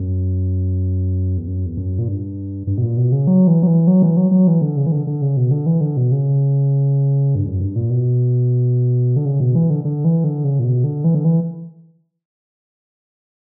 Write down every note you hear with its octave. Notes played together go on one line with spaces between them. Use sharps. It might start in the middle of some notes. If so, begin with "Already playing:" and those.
Already playing: F#2
E2
F#2
E2
F#2
A#2
G2
G2
B2
A#2
B2
C#3
F#3
E3
F#3
E3
F#3
E3
F#3
F#3
E3
D3
C#3
E3
D3
D3
C#3
B2
D3
E3
D3
B2
C#3
G2
F#2
G2
A#2
B2
D3
C#3
B2
E3
D3
D3
E3
D3
C#3
A#2
B2
D3
E3
D3
E3